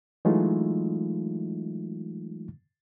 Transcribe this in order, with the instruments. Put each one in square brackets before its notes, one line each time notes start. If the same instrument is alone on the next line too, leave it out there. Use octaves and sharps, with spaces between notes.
[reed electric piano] E3 F#3 G#3 A3 D#4 F4